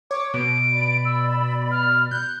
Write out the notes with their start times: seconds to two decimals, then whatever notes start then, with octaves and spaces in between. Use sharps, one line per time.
0.11 C#5 D6
0.34 B2 D7
0.71 D5 B5
1.05 E6
1.71 F6
2.11 F#6 G6